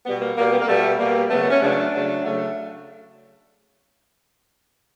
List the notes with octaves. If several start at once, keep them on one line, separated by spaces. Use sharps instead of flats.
B2 G3 B3
A#3
B2 G3 A#3
B3
A#3
B2 G3 A3
B2 G3 A#3
C#3 F#3 A3 B3
B3
C#4
C#3 F#3 A3 D4
C#3 F#3 A3
C#3 F#3 A3